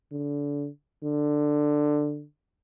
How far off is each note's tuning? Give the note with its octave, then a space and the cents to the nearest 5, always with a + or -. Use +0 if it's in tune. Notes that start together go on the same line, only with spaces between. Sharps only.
D3 -25
D3 +10